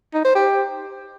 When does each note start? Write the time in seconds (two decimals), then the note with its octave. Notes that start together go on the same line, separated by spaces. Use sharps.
0.14 D#4
0.25 C5
0.35 G4